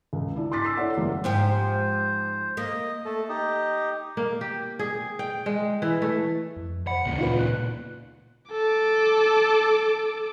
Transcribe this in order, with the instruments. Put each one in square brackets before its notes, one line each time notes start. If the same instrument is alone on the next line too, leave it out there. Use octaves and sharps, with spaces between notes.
[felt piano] C#2
D4 E4
C6 D6 A6 B6
D6 E6 A6 C7
E4 A4 C#5 D5 E5 F#5
F#1 G3 A#3
[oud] G#2 F3 G4 [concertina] C5
[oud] A#3 [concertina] D#5
[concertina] A3 A4
D#4 G4 D#5
[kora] A#3
G4
G#4
G5
G#3
E3
A3
[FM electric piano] F2
[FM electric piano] C5 B5 [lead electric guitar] F#5
[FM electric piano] D2 [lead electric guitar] A#2 C#3
[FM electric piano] D#4 F4 B4
F#6
[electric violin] A4 D6